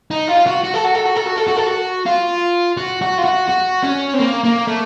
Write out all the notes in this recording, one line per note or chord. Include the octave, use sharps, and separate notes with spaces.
D#4
F4
F#4
F#4
A4
F#4
A4
F#4
A4
F#4
A4
F#4
A4
F#4
F4
F#4
F#4
F4
F#4
F#4
C#4
C4
A#3
A#3
A3